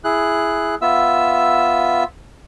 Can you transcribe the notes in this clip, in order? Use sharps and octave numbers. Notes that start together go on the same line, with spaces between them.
E4 G#4 F#6
B3 F4 E5 E6